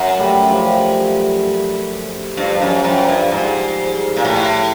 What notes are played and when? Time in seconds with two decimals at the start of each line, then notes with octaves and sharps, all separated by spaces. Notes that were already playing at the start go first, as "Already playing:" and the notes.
Already playing: F#2 F#3
0.19 G3 A3
0.50 F3 G3
2.37 G2 F3
2.62 F#2
2.84 F#2 F3 G3
3.08 G2
3.31 G#2
4.17 A#2
4.25 A2